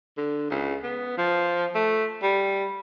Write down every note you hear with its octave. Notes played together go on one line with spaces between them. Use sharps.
D3
C#2
B3
F3
A3
G3